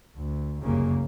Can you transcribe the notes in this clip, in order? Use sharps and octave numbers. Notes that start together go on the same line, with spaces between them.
D2
F1 C2 F#2 C#3 A#3